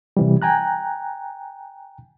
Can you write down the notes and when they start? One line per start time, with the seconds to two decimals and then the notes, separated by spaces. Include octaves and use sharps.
0.17 C3 E3 G3
0.42 G5 G#5 A#5 F#6